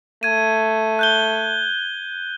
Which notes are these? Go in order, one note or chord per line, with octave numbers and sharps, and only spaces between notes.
A3 G#6 D#7
F#6 G6 G7